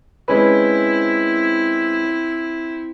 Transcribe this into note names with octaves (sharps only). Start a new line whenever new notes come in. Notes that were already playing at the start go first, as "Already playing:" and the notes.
G#3 C4 C#4 E4 B4